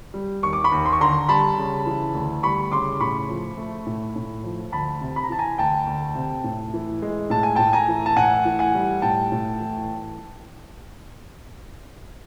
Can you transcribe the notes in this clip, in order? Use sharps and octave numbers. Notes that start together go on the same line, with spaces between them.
G3
D#2 C#6
D6
B5 C#6
D#2
C6
C#6
D3 A#5 C6
G3 A5 B5
C#3
E3
D2
G3 B5 C#6
C#3 C6 D6
A2 B5 C#6
F3
A3
A2
A2
F3
D2 A5 B5
C3
B5
A#5
E3 A5
G#5 A#5
D2 G5 A5
D2
C3
A2
E3
G#3
A2 A5
G#5
A2 G5 A5
G#5 A#5
E3
A5
A2 F#5 G#5
E3
F#5 G#5
G3
A2 G5 A5
A2
E3